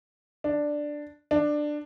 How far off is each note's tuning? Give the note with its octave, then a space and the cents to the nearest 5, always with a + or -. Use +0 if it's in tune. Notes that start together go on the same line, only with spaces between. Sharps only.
D4 +5
D4 +15